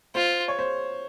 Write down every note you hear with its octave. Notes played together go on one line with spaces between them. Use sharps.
F4 C5
C#5
C5